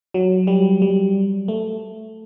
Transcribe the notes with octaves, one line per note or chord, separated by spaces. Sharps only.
F#3
G3
G3
A3